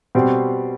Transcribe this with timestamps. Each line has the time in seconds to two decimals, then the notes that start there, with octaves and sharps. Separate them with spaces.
0.15 B2 G3 C4